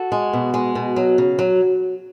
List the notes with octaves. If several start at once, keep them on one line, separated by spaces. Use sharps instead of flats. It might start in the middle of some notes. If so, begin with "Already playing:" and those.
Already playing: F#4 A4
G#3
B2
G#3
B2
F#3
C#3
F#3